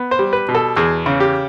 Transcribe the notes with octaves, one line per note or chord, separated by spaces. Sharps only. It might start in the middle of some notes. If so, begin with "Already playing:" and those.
Already playing: B3
C5
G3
B4
B2
A4
E2 G#4
C#3
G4